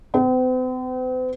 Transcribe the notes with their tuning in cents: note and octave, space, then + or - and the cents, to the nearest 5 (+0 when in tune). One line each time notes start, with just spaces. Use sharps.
C4 -45 C5 -45